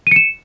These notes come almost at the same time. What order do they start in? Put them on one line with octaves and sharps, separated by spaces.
D#7 C#7 E7